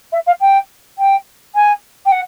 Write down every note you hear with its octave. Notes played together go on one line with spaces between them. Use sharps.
E5
F5
G5
G5
G#5
G5
F#5